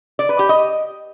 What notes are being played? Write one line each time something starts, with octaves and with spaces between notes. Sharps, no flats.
D5
B4
G4
D#5